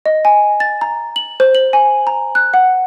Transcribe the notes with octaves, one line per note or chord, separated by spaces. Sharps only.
D#5
G#5
A6
A#5
F#7
C5
F#7
G#5
A#5
F#6
F#5